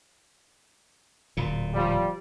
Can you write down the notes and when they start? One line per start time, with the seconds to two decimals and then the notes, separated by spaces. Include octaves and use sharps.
1.37 D1 A#2
1.74 F3 G3